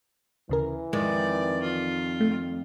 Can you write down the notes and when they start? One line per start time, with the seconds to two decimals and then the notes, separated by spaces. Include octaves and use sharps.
0.49 D2 C#3 E3 A#4
0.93 F2 D#3 G#3 D5
1.63 F4
2.21 A3